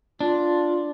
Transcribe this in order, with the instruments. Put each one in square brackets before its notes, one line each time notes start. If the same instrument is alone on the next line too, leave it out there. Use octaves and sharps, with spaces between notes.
[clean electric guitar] D4 [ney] F4